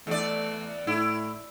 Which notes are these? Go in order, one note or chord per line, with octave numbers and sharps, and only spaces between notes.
E2 A3 D5
A2 E4